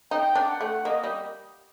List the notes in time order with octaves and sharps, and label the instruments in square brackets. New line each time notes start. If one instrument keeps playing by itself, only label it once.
[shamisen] D#4 [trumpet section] G5
[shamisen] D4
[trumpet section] F#5
[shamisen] A3
[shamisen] A#3 [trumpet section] D#5
[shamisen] G3